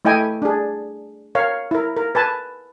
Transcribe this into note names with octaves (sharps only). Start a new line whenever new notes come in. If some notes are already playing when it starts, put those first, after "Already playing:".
A3 E4 D#5 G5 G#5
D4 G#4
A#4 C#5 F5
E4 A#4
A#4
B4 G#5 A5